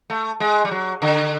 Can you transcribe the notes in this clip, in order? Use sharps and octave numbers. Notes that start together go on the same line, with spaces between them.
A3
G#3
G3
F#3
D3